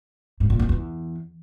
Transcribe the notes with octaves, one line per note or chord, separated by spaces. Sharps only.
G#2
A#2
F#2
E2